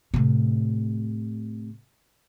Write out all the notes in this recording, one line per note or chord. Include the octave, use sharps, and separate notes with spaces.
A2 C3